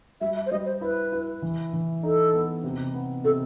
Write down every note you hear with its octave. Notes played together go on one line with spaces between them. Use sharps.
G3 E5
E5
C5
G3 D#5
C5
E4 B4
E4
E3
E3
D#4 A4
B3
C3
B3
C3 A4